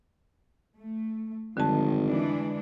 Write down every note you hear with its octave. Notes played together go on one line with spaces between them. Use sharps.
A3
G#1 F2 D3 D#3 F3 G3 A5
E3 G#3 D4